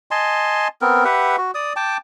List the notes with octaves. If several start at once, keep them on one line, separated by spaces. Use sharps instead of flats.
D#5 G#5 A5 C6
B3 C4 A#4
G4 B4 E5 F#5
F#4
D5 D#6
G5 A5 D6